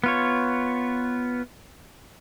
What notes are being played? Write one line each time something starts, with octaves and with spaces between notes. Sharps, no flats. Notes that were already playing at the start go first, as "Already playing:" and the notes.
B3 F4 C#5